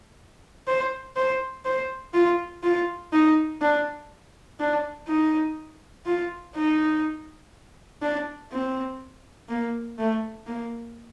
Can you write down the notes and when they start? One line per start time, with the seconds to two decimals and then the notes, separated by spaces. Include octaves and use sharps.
0.67 C5
1.16 C5
1.65 C5
2.13 F4
2.63 F4
3.12 D#4
3.61 D4
4.60 D4
5.07 D#4
6.06 F4
6.56 D#4
8.02 D4
8.52 C4
9.49 A#3
9.99 A3
10.47 A#3